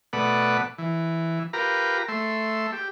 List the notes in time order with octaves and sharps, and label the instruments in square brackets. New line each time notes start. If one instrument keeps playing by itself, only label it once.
[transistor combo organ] B2 A3 B4 D5 F#5
E3
F4 G4 A#4 B4 A#5
A3 E5 C6
G4